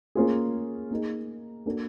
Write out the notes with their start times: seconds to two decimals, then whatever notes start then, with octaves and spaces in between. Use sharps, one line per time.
0.15 A#3 C#4 F4 G#4
0.91 A#3 D#4 G#4
1.66 A#3 D4 F#4 A4